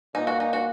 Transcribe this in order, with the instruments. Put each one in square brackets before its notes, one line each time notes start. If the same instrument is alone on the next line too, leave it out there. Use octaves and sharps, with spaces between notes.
[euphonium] A#2 [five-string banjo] D#4
[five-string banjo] F#4
D#4
F#4